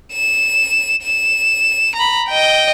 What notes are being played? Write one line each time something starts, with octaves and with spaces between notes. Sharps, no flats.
E7
E7
A#5 B5
D#5 G5